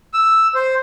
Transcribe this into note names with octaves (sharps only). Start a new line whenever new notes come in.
E6
C5